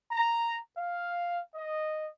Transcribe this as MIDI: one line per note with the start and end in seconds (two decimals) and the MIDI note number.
0.12 0.57 82
0.78 1.40 77
1.55 2.06 75